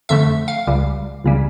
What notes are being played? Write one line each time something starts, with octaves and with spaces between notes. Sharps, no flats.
F2 D3 A3 E5
F5
C#2 C#3 G3
C#2 C#3 G3